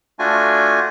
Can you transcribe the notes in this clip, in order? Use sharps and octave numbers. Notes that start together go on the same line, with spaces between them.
A3 D4 F4 F#4 G#5